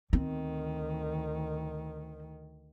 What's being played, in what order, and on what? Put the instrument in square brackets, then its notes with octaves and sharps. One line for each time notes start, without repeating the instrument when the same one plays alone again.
[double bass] D2 D#3 [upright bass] C4